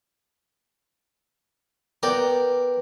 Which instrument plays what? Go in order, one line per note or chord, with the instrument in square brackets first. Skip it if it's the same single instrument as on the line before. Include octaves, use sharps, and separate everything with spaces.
[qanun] B3 [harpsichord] A#4 D5 G5